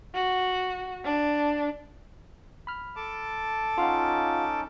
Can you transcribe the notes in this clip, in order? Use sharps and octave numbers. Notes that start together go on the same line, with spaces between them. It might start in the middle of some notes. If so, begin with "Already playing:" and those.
F#4
D4
B5 F6
A4 A5 D6
C#4 D#4 F4 F5 F#5